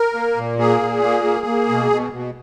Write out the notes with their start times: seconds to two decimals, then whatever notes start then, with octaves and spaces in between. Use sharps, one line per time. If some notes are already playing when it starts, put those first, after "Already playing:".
Already playing: A#4
0.15 A#3
0.36 A#2
0.59 A#3 G#4
0.81 A#2
1.03 A#3
1.24 A#3
1.46 A#3
1.69 B2
1.91 B2
2.12 B2